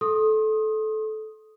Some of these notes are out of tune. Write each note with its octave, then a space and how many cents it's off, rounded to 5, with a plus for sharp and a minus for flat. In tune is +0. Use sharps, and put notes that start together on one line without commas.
A4 -20 C6 +35 D#6 +0